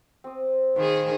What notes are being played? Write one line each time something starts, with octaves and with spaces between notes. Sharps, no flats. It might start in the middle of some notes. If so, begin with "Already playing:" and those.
C4 D#6
D#3 G#4 B4 C5 F5